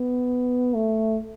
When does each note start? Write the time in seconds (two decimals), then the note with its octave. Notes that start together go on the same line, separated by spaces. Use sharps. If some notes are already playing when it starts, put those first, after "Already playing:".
Already playing: B3
0.74 A3